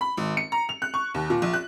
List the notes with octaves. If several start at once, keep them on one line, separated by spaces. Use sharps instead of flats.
B5
G#1
C#7
A#5
F7
F#6
C#6
D#2
A#2
A#1
F#6